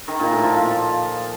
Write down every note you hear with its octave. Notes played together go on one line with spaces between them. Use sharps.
D#3
A#2
A2
F3
A#2